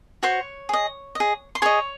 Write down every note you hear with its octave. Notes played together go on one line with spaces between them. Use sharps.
F#4 C5 C#5 C#6
G#4 D#5
G#4 D#5
C6
G#4 C#5 D#5 C#6